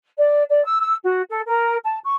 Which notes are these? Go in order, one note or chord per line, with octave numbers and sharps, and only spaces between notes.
D5
D5
E6
E6
F#4
A4
A#4
A5
C#6